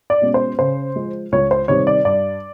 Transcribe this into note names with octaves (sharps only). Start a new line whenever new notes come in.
D5
B2 G#3 C#4
C5
C#3 C5
F3 G#3
C#2 C#5
C5
C3 D#3 G3 C4 C#5
D5
G2 D5